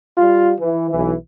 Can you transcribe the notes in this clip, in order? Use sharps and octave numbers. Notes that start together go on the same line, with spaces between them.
G3 F4
E3
B1 E3